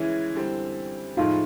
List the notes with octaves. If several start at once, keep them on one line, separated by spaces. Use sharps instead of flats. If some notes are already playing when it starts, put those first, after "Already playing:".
Already playing: C#3 E3 G#3 C#4 E4
D3 G3 C4
A2 F3 G#3 D#4 F4